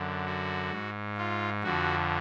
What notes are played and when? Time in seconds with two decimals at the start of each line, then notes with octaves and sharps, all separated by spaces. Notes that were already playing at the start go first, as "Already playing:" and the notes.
Already playing: F#2 D3
0.26 F#4
0.71 G#2
1.18 F4
1.63 F2 D3 F#4